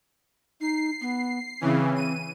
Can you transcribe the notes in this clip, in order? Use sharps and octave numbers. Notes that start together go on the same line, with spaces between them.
D#4 C7
B3
C#3 E3 C4
D#7